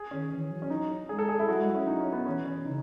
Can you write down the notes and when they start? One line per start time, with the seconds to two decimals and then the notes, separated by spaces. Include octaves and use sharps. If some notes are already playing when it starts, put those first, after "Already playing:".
Already playing: G#4
0.11 D#3 C#4
0.30 E3
0.51 F#3
0.62 C#4
0.70 D#4
1.09 G#3 G#4
1.19 A4
1.29 G#4
1.40 E4
1.48 F#3 F#4
1.59 G#3 E4
1.69 F#3
1.75 C#4
1.87 D#4
2.00 C#4
2.12 B3
2.26 E3 C#4
2.46 C#4
2.65 C#3 D#4